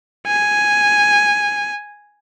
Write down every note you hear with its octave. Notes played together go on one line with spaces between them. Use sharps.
G#5